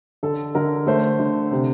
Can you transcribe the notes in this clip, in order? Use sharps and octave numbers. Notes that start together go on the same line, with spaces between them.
D3 A4
D3 A#4
A3 C5
D3
C3